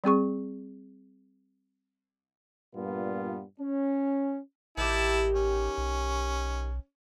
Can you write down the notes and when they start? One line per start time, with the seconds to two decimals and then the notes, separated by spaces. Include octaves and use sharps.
0.04 G3 C4 G#4 C#6
2.75 G2 A#2 B3 F4
3.59 C#4
4.77 A1 D#3 E4 G4 A5
5.35 C#4
5.78 B1